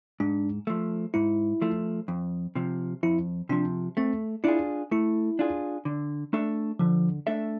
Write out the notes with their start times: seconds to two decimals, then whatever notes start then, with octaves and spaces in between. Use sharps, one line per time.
0.20 G#2 D4
0.67 F3 A3
1.14 G#2 E4
1.62 F3 A3
2.08 F2
2.55 C3 F3
3.03 F2 E4
3.49 C3 F3 D4
3.97 A3 C4
4.44 D4 E4 F4 G#4
4.91 A3 E4
5.39 D4 F4 G#4
5.85 D3
6.33 A3 D4 A4 E5
6.79 D3 F3
7.27 A3 D4 A4 E5